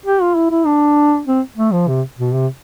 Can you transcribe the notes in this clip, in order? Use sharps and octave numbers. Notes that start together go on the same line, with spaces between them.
G4
F4
E4
E4
D4
C4
A3
F3
C3
B2
C3